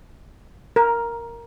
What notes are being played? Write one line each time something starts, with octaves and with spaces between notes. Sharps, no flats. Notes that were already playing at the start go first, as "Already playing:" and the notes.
A#4